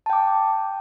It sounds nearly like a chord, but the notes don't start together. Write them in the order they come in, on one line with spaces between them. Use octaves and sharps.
A5 G5 D6